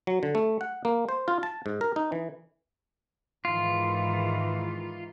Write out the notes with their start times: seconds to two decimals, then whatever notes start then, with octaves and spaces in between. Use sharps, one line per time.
0.07 F#3
0.23 D3
0.35 A3
0.61 F#5
0.85 A#3
1.09 C5
1.28 F4
1.43 A5
1.66 G#2
1.81 A#4
1.96 D#4
2.12 E3
3.45 G#2 D#3 E3 F4